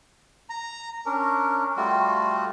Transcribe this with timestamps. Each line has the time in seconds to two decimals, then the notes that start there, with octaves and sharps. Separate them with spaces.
0.49 A#5
1.06 C#4 D4 A#4
1.77 G3 A3 F4 F#4